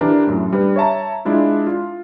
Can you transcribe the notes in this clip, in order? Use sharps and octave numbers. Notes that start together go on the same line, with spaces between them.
E3 D4 G4 A#4
F#2 A2
G3 D4 B4
C#5 E5 A5 A#5
G#3 D4 E4 F4
F4